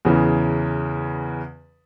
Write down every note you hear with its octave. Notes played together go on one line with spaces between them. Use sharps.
E2 C#3 E3